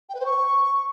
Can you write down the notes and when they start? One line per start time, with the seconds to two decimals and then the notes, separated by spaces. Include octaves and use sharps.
0.09 G5
0.15 B4
0.20 C5
0.25 C#6